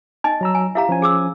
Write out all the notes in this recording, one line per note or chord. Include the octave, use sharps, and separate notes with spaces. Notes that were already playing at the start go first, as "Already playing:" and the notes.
D#4 D#5 G#5
F#3 A#5 E6
G#5
E4 G4 E5 F5 A#5
F3 C#4 G#5
G#4 D6 E6